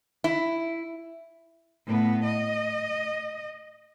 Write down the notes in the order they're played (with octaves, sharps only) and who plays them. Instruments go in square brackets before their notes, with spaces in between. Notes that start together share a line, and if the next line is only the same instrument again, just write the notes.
[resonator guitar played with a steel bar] E4
[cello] A2 B3
D#5